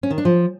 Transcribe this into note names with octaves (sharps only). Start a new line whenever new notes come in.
C#4
D#3
D4
F3